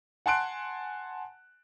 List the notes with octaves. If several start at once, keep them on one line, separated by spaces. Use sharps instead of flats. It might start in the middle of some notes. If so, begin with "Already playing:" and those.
F#5 G#5 A5 C6 F#6 D7